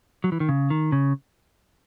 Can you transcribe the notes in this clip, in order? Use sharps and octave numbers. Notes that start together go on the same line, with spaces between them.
F#3
E3
D#3
C#3
D#3
C#3